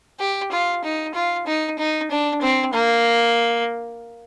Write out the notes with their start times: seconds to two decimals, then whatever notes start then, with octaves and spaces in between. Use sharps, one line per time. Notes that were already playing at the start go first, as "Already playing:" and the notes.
0.19 G4
0.52 F4
0.84 D#4
1.15 F4
1.47 D#4
1.79 D#4
2.11 D4
2.42 C4
2.73 A#3